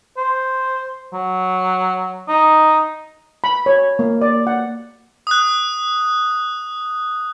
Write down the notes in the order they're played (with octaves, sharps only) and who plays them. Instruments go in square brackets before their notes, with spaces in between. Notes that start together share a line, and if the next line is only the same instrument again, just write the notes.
[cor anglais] C5
F#3
D#4
[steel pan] B5
C#5
A#3
D5
F#5
[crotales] D#6 F#6